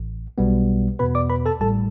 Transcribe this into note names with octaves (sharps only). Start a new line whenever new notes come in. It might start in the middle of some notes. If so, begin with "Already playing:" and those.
Already playing: A1
B1 B2 G3 B3
E2 B2 B3 B4 B5
D5 D6
B4 B5
A4 A5
A1 A2 G3 A4 A5